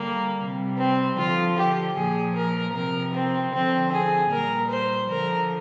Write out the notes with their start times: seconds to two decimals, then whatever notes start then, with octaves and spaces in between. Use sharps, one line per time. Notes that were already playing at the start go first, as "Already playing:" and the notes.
Already playing: D3 G3 A#3
0.38 C3 G3
0.77 C4
1.17 D3 F3 F4
1.56 G4
1.95 A#2 F3 G#4
2.33 A#4
2.73 C3 F3 A#4
3.13 C4
3.52 D3 F3 C4
3.91 G#4
4.30 A#2 G3 A#4
4.69 C5
5.09 D3 F3 A#4